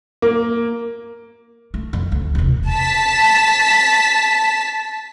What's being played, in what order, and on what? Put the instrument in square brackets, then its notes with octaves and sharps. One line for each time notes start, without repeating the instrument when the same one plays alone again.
[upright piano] A#3
[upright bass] A3
F2
D2
E1 C3
[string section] A5 B6